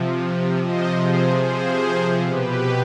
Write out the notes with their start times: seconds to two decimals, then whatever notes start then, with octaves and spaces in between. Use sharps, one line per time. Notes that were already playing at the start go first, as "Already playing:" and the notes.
Already playing: C3 F3
0.62 C3 F3 C5 D#5
1.02 G#4 C5
1.43 G#4 C5
2.23 B2 G4 B4